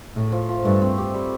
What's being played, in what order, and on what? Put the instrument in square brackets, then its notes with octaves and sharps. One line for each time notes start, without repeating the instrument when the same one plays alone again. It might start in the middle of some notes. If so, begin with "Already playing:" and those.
[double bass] A2 [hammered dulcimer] A3
[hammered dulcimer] F3
F3
[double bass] G2 [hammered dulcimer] A3
[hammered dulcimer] C4
G4
G3